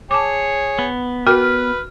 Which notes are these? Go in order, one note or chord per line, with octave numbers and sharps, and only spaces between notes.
G#4 C#5 A5 D6
B3
F#4 A#4 B4 G5 F6